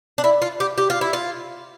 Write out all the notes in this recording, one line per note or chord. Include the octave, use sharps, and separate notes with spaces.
D4
E4
F4
G4
G4
F4
E4
F4